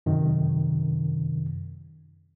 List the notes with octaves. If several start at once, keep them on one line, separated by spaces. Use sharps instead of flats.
F#2 C3 D#3